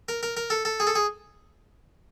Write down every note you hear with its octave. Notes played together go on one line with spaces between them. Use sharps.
A#4
A#4
A#4
A4
A4
G#4
A4
G#4